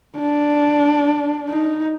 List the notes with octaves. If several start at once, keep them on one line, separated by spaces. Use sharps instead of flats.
D4
D#4